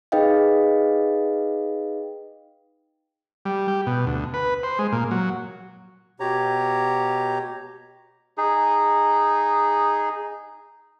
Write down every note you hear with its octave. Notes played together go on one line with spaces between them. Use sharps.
D#4 G#4 B4 D#5 F5 G5
G3
G4
B2
D2
B4
C5
G#3
A#2
F#3
B2 G4 C#5 A#5
D#4 G#4